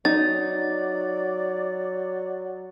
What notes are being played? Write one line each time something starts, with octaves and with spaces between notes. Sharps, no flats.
F#3 D#4 D5 A6